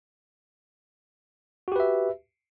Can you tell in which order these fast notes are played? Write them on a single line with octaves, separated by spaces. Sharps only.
F#4 G4 B4 E5